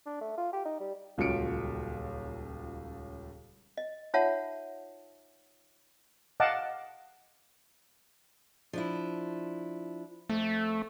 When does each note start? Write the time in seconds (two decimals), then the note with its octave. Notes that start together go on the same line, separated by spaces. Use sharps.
0.06 D4
0.21 A3
0.37 F4
0.53 G4
0.65 D#4
0.80 G3
1.18 D#1 C#2 F#3 F4 C#7 D7
3.78 D#5
4.14 D#4 F4 C#5 E5 F#5 A5
6.40 D#5 F5 F#5 A5 D6
8.73 F3 D4 E4
10.29 F2 A3